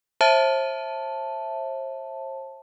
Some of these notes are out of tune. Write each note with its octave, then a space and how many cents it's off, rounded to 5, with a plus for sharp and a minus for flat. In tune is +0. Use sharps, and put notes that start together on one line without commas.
C5 +40 E5 +0 A5 +0